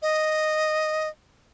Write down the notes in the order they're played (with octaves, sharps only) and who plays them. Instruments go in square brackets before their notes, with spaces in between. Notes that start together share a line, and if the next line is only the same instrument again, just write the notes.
[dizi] D#5